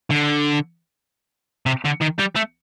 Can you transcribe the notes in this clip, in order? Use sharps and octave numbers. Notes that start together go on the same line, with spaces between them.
D3
C3
D3
D#3
G3
A3